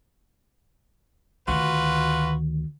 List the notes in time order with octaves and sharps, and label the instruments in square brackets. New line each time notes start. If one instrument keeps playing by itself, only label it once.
[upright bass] D2 D#3 [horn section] F4 F#4 B4